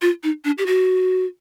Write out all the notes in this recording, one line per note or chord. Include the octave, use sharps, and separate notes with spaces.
F4
D#4
D4
G4
F#4